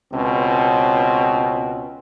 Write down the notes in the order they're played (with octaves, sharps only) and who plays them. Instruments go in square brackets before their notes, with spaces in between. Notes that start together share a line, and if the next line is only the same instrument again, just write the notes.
[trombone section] C#2 B2 C4 C#4